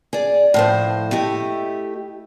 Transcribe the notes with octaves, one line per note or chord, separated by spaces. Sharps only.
G#4 D5
A2 F3 C5
A3 E4 G4 D#5